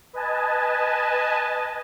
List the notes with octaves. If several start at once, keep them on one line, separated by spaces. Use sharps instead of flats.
B4 D#5 G#5 A5